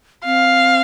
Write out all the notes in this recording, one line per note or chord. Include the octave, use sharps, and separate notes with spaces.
C4 F5